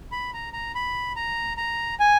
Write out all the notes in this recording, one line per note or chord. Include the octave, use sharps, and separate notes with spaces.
B5
A#5
A#5
B5
A#5
A#5
G#5